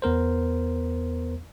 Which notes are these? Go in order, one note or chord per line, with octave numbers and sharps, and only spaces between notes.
E2 B3 A#4 C5